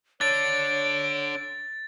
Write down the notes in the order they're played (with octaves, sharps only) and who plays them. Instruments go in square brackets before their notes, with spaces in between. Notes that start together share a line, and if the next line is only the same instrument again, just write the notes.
[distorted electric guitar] D3 [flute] C#5 [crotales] A6 [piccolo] D7